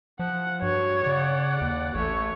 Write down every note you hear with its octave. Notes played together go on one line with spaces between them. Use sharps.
F3 F#5
G2 F#4 C#5
C#3 D5 F#5
D#2
A1 A3 C#5